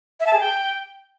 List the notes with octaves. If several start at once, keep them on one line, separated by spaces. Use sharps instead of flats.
E5
A5
G#4
G5